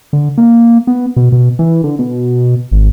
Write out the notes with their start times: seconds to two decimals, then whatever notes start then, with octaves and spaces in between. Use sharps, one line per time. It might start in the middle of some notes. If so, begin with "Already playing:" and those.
0.13 D3
0.38 A#3
0.87 B3
1.16 B2
1.32 B2
1.59 E3
1.84 D3
1.99 B2
2.71 G#1